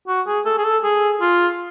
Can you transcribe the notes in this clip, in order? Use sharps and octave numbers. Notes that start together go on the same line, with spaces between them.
F#4
G#4
A4
G#4
A4
G#4
F4